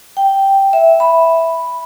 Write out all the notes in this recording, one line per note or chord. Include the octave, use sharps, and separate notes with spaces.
G5
E5
B5